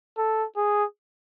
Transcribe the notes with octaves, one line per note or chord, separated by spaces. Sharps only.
A4
G#4